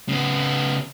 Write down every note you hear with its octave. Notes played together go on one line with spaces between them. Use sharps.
C#3 B3